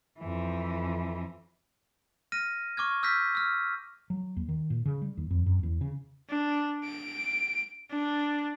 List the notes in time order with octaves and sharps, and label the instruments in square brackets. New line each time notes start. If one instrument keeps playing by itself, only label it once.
[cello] F2 E3
[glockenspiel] F6 A#6 D#7
C#6 D6 F6 G#6
E6 F6 G6 A#6 B6
E6 F6
[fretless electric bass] F#3
D#2
D#3
A#2
C#3
G3
D#2
F2
F#2
E2
C#3
[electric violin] D4
D7
D4